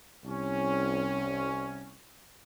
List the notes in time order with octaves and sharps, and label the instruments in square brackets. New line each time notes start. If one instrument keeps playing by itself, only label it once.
[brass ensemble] C2 C#4